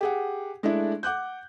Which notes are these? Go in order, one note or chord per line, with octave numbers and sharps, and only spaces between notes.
G4 G#4 F#5
G#3 A3 D4 E4 A4
F#5 D6 F#6 G6